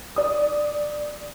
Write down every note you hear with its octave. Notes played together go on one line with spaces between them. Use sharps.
D5 D#6